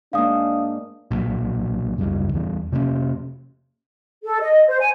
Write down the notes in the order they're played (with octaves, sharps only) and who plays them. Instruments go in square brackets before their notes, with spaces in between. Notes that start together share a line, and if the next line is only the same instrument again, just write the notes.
[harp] G#2 A#3 [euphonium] D4 [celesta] F5 D#6
[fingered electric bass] B1 A#2
F#1 C#2 C3 G3
E2 E3 G3
C3 A#3 B3 C#4
[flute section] A4
D#5
C5
G#5